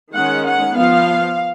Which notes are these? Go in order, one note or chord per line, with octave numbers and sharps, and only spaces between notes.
D#3 G#3 C#4 F#5
F#5
F3 B3 F5